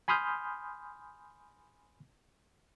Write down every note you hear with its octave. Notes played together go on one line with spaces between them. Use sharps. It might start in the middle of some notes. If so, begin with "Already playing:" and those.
G#5 B5 C6 D#6 F6 G6